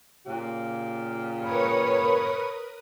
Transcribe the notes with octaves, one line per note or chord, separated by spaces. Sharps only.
A#2 C#3 G4
A#4 B4 C#5 B5 D#6